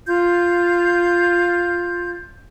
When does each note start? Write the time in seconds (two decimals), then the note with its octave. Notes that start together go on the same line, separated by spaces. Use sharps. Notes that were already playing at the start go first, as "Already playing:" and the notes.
0.05 F4 G6